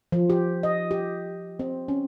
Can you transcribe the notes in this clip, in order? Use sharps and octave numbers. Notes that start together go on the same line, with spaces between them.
F3
G4
D#5
G4
C4
C#4